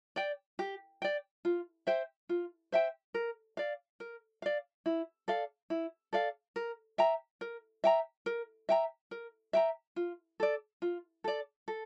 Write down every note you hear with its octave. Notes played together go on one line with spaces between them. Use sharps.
D5 G5
G4
D5 G5
F4
C5 E5 G5
F4
C5 E5 G5
A#4
D5 F5
A#4
D5 F5
E4
A4 D5 F5
E4
A4 D5 F5
A#4
E5 G5 A#5
A#4
E5 G5 A#5
A#4
E5 G5 A#5
A#4
E5 G5 A#5
F4
A4 D5
F4
A4 D5
A4